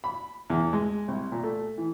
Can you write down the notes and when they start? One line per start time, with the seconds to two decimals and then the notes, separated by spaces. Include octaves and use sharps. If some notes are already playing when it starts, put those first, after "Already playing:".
0.04 B5
0.50 E2
0.73 G#3
1.08 C2
1.32 A#2
1.43 A3
1.78 E3